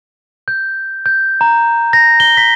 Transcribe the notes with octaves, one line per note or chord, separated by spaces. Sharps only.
G6
G6
A#5
A#6
G7
B6